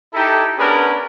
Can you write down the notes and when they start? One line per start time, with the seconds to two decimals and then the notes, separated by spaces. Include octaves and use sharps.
0.14 D#4 E4 G4 A4
0.58 B3 C#4 D4 G#4 A#4 B4